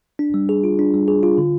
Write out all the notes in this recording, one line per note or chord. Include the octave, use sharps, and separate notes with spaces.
D4
G3
G#4
F4
D4
G3
G#4
F4
D3